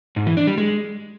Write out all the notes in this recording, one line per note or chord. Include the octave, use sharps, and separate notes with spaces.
G#2
E3
D4
G3
G#3